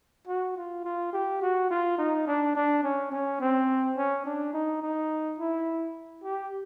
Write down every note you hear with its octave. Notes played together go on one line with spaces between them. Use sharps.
F#4
F4
F4
G4
F#4
F4
D#4
D4
D4
C#4
C#4
C4
C#4
D4
D#4
D#4
E4
G4